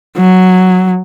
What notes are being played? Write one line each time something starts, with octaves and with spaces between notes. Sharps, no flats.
F#3